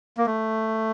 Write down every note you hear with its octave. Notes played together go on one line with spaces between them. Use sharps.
A#3
A3